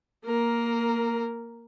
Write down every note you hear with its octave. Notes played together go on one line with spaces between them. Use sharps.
A#3 A#4